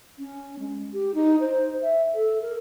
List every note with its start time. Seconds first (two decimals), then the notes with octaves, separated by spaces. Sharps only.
0.19 C#4
0.59 G#3
0.92 G4
1.14 D#4
1.40 C5
1.82 E5
2.15 A4
2.42 A#4